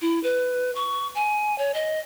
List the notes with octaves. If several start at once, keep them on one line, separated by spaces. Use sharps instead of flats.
E4
B4
C#6
G#5
C#5
D#5